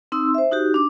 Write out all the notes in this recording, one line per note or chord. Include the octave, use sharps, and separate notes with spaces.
C4 D#4 C6 E6
C5 E5
D#4 F#4 G4
D4 D6